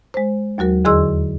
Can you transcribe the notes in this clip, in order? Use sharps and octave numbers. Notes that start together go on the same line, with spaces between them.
G#3 C5
D#2 F#3 F#4 A#4
E2 D3 G#4 D#5 C6 E6